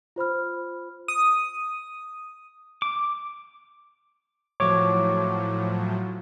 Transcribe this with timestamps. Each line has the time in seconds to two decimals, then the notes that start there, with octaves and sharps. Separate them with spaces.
0.16 F4 C5 B5 F6
1.08 D#6
2.82 D6
4.60 A2 F3 F#3 C#5 D6